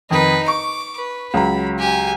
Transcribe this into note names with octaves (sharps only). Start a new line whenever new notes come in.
F2 D#3 D#4 B4
C#6 D6
B4
C#2 F#3 A#5 B5
G4 G#5